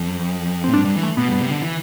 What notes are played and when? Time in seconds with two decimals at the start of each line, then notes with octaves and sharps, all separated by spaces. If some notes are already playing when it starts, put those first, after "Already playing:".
Already playing: F2
0.64 C4
0.69 A2
0.73 G2 D4
0.85 G2
0.96 E3
1.03 A3
1.17 B2 B3
1.29 G2
1.40 C3
1.50 D3
1.62 E3